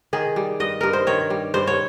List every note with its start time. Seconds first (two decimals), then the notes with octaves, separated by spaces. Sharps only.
0.13 D#3 G#4
0.36 G3
0.60 G2 D#5
0.81 G2 A#4
0.93 C5
1.07 D#3 C#5
1.30 G3
1.54 G2 C5
1.67 C#5